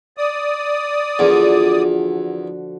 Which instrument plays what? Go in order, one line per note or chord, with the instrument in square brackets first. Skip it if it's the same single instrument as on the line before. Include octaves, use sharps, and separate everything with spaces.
[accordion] D5 D#6
[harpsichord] E2 [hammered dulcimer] D3 F3 F#4